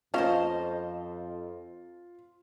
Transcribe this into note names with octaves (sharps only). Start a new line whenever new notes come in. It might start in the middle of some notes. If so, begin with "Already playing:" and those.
F2 A#3 C#4 F4 C5 D#5 F5 A5